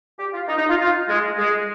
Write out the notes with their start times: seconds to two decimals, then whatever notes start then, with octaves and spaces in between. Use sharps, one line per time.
0.19 G4
0.34 F4
0.48 D#4
0.58 D#4
0.69 F4
0.79 F4
1.09 G#3
1.39 G#3